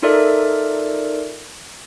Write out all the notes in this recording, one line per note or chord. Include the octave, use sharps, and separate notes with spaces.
D#4 F4 A4 A#4 D5 E5